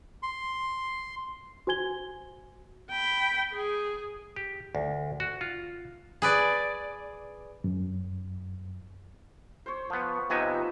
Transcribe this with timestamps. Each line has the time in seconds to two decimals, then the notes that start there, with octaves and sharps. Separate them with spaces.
0.23 C6
1.67 F#4 C5 G#5 G#6 G7
2.91 G5 B5
3.53 G#4
4.36 G4
4.75 D2
5.20 F#4
5.41 F4
6.22 G#4 B4 D5
7.64 F#2
9.66 C5 C#5
9.90 F3 B3
10.30 C3 F3 B3 D#4 E5 G#5